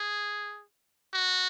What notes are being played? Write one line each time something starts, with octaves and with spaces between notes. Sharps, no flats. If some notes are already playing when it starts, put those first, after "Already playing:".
Already playing: G#4
F#4